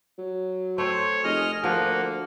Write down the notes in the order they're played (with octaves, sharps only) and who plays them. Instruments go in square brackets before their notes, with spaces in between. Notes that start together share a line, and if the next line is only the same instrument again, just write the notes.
[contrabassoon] F#3
[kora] A3 C4 [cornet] C5 [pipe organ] C#5
[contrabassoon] F1 [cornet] G#4 [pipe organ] D#5 F6
[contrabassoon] D2 [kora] F3 [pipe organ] A#3 [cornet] F#5